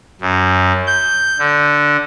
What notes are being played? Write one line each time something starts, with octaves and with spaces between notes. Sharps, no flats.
F#2
G6
D3